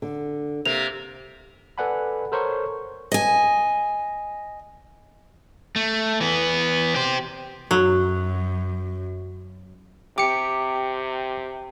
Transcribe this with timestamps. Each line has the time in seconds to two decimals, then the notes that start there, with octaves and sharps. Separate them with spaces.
0.02 D3
0.66 C3 A#3 F7
1.78 A4 B4 D5 F#5 G#5 B5
2.32 A4 A#4 C5 C#5 A#5 C#6
3.12 D#5 G#5
5.76 A3
6.20 E3 B3
6.96 G4 C5
7.71 F#2 F#3
10.18 C3 G4 D6 C#7